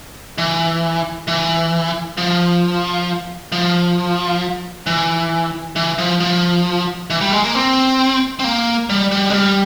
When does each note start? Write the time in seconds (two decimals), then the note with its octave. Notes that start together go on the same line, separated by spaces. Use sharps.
0.38 E3
1.28 E3
2.18 F3
3.52 F3
4.87 E3
5.76 E3
5.98 F3
6.20 F3
7.10 E3
7.21 G3
7.32 G#3
7.44 A#3
7.55 C4
8.39 C4
8.44 A#3
8.89 G3
9.11 G3
9.30 G#3
9.34 G3